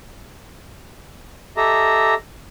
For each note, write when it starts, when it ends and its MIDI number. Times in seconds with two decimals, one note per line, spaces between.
1.57 2.14 67
1.57 2.14 69
1.57 2.14 75
1.57 2.14 76
1.57 2.14 82